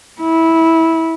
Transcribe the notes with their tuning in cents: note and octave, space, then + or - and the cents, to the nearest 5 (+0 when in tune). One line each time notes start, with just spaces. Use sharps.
E4 -15